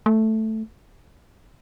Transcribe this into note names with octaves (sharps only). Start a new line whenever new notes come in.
A3